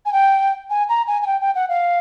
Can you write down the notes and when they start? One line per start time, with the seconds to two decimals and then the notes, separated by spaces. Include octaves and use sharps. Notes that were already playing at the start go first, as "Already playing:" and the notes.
0.06 G#5
0.13 G5
0.70 G#5
0.89 A#5
1.07 G#5
1.22 G#5
1.27 G5
1.41 G5
1.55 F#5
1.69 F5